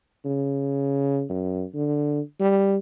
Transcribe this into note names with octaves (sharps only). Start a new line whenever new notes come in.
C#3
F#2
D3
G3